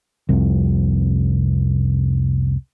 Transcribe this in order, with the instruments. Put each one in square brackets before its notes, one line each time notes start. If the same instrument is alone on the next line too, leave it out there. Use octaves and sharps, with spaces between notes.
[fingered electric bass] F1 C2